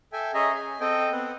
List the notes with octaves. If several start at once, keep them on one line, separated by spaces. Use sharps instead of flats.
A4 E5 G5 G#5
C#4 G#4 D#5 E5 A#5
G#5
C4 A4 D#5 G5
B3 C4 F#5